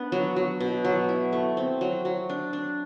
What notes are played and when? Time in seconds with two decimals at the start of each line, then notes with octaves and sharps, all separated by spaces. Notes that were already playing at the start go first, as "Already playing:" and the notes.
Already playing: B3 D4
0.12 F#3
0.36 F#3
0.61 B2
0.85 F#3
1.09 E4
1.33 A3
1.57 C4
1.81 F#3
2.05 F#3
2.29 D4
2.53 D4